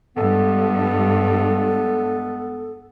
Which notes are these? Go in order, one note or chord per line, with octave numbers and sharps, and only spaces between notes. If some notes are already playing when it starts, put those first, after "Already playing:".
G2 G#3 B3 A4